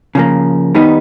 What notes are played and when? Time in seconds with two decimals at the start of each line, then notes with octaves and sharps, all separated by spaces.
0.15 C#3 F3 A#3
0.75 D#3 G3 B3 D#4